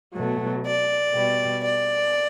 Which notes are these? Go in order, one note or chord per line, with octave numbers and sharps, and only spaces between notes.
B2 F#3 A3
D5
B2 G3
D5